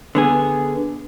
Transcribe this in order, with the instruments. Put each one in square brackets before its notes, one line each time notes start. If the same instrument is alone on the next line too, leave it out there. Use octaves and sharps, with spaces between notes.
[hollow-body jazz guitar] D3 B3 G#4